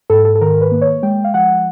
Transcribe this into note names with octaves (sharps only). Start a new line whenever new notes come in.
G#2 A4
A4
A4
D#3 A#4
B4
A#3
C#5
G#3 G5
F5
F3 F#5